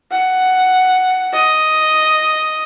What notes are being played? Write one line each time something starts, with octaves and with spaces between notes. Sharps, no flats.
F#5
D#5